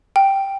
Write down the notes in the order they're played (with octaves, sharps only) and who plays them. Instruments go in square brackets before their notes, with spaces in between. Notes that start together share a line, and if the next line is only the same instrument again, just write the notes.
[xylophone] G5